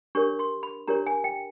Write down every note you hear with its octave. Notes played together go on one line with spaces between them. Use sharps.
D4 G4 A#4 C#5 C#6
C6
B5
D4 G4 A#4 C#5 A#5
G#5
G5